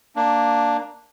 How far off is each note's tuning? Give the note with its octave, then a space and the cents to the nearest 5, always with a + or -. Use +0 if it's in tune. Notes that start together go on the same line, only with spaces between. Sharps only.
A#3 +0 D4 +0